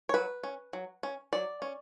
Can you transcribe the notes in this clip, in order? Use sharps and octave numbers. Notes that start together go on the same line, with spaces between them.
C#5
F#3 B4
C#4
F#3
C#4
F#3 D5
C#4